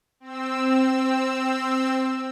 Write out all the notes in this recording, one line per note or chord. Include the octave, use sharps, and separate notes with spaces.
C4 E6